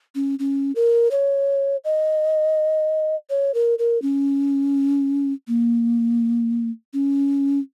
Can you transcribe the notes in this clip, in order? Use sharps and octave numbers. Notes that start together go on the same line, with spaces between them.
C#4
C#4
A#4
C#5
D#5
C#5
A#4
A#4
C#4
A#3
C#4